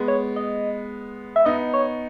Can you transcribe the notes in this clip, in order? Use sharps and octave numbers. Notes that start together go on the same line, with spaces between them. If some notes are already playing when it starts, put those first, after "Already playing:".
Already playing: G#3 B3
C#5
D#5
E5
B3 D#4 D#5
C#5